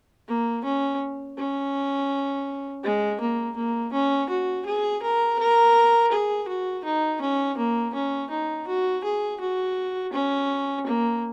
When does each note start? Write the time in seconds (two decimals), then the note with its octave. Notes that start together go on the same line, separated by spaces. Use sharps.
0.28 A#3
0.65 C#4
1.38 C#4
2.83 G#3
3.20 A#3
3.56 A#3
3.93 C#4
4.29 F#4
4.66 G#4
5.02 A#4
5.39 A#4
6.12 G#4
6.48 F#4
6.84 D#4
7.21 C#4
7.58 A#3
7.94 C#4
8.30 D#4
8.68 F#4
9.04 G#4
9.40 F#4
10.13 C#4
10.87 A#3